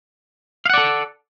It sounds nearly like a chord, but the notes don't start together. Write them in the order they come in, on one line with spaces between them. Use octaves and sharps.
F5 F#5 D5 A4